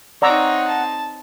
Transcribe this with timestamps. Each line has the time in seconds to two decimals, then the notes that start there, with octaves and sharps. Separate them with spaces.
0.22 C4 D#4 C#5 D5 F#5 A#5 E6
0.68 A5